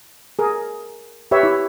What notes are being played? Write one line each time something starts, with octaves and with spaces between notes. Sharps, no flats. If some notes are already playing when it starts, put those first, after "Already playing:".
G#4 A#4
G4 B4 C#5 E5
E4